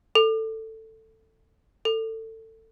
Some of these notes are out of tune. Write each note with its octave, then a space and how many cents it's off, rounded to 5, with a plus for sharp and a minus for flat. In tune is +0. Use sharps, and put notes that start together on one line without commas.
A4 +15
A4 +25